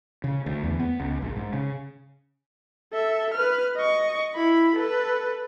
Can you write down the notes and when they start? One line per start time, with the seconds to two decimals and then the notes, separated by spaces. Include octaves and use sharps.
0.24 C#3
0.46 D2
0.63 E2
0.80 B3
1.00 C#2
1.22 A#1
1.36 G#2
1.53 C#3
2.93 A4 E5
3.34 B4 F6
3.76 D#5 C#6
4.35 E4 B5
4.76 A4 B4